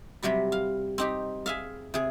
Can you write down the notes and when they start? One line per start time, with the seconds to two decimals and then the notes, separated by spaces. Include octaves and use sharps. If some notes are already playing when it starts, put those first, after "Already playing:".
0.23 C3 F#3 G3 B5
0.52 F5
0.98 C4 D#4 G4
1.46 G#4 E5 F5
1.94 C3 G#4